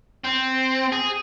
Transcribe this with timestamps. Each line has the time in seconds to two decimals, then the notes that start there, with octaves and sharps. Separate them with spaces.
0.24 C4
0.92 G#4